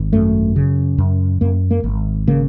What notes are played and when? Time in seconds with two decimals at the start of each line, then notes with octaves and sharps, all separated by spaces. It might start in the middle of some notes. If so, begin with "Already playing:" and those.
Already playing: G#1
0.13 F#2 A3
0.56 C#3
0.98 F#2
1.41 F#2 A#3
1.71 A#3
1.84 G#1
2.27 C#3 A#3